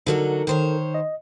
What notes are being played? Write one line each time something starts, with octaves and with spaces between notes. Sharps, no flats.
D3 F#3 D#4 F#4 A4 A#4
D#3 C5 C#5
D#5